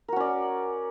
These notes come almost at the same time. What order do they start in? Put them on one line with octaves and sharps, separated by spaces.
A#4 F#4 C#4 D5